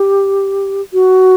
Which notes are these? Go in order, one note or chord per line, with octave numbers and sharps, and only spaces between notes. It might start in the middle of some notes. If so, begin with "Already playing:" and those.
Already playing: G4
F#4